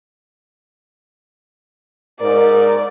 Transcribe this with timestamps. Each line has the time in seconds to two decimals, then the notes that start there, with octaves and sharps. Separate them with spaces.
2.20 G#2 A#4 D5